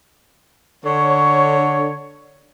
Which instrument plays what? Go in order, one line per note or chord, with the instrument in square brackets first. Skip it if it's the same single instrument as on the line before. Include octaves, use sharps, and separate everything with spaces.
[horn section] D3 C#5